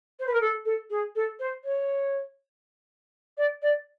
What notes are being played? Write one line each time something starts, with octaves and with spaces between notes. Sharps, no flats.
C5
B4
A#4
A4
A4
G#4
A4
C5
C#5
D5
D5